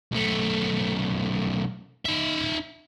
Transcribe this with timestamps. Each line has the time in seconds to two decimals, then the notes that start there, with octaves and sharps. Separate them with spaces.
0.12 B1 A3
2.05 D#4 E5